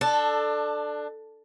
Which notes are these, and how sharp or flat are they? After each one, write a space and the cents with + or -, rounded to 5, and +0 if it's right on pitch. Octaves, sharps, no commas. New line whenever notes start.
D4 +20 A4 +0